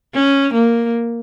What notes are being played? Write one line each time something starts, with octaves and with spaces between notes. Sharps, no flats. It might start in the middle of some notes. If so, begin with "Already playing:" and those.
C#4
A#3